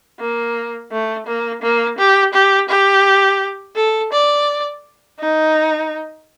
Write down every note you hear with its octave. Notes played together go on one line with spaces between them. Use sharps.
A#3
A3
A#3
A#3
G4
G4
G4
A4
D5
D#4